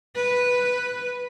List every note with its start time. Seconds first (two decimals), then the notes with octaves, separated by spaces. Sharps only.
0.15 B4